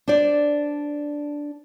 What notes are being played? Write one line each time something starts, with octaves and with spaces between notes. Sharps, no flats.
D4 C5 D5